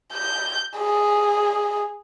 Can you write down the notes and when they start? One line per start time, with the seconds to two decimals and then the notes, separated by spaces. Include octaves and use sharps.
0.13 G6
0.79 G#4